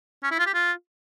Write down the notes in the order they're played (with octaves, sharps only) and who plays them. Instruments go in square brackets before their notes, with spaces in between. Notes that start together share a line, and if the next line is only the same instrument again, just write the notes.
[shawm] C#4
E4
F4
G4
F4